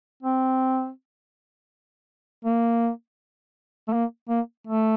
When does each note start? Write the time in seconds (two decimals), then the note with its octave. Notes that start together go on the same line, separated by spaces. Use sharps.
0.23 C4
2.45 A#3
3.88 A3
3.93 A#3
4.29 A#3
4.67 A3